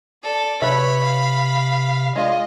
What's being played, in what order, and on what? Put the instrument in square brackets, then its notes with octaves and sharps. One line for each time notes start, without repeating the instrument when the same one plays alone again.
[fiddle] A4 [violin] D5
[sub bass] C3 [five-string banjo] B4 E5 [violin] C#5 [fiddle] B5
[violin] F5
[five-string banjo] G#3 F4 D5 [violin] D#5